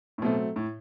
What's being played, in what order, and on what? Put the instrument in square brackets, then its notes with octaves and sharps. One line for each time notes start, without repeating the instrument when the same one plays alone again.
[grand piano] A2
[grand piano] B2 [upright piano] F#3 A3 C4
[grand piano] A2